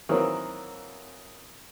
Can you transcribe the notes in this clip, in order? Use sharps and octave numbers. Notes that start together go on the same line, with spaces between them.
D#3 E3 F#3 A#3 C4